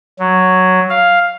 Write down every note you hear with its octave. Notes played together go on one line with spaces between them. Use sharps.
F#3
F5